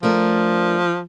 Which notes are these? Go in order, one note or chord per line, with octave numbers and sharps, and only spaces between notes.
F3 A3 D4 A#4